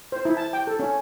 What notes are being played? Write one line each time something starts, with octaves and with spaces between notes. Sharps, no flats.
C5
E4
A5
G5
A4
C#4